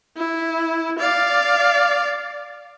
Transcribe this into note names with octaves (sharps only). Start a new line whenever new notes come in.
E4
D5 F5